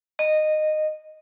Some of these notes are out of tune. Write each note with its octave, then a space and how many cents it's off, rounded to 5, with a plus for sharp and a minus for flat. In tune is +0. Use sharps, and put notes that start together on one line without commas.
D#5 -15